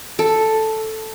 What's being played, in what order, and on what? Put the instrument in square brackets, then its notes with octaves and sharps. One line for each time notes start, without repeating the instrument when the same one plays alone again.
[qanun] A4